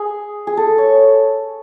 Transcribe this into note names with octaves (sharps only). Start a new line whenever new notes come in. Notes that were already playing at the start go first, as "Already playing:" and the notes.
Already playing: G#4
G#4
A4
C#5